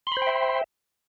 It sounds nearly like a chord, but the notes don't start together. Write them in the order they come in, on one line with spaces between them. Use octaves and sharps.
C6 B5 C5 G5 E5